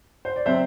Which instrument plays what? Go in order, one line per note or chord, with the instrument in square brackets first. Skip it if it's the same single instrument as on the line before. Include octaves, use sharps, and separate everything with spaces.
[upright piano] C5
D5
C3 F#3 C4 C5 E5